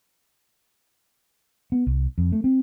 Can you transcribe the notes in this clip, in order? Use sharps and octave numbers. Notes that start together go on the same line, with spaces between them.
B3
C2
F2
A3
C4